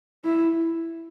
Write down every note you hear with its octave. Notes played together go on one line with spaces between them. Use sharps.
E4